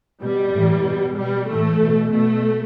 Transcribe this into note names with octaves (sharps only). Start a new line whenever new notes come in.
B2 G3
A2 E3
B2
B2 G3
A2 E3 A3
B2
B2 A3